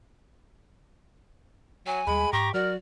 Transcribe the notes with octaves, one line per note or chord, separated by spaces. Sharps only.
F#3 G#5
D#2 G3 G#3 B5
G#2 G4 A#5 C#6
F#3 F#4 A#4 D5